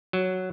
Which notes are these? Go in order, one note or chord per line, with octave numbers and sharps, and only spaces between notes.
F#3